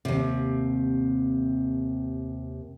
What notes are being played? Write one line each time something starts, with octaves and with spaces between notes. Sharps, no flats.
D#2 C3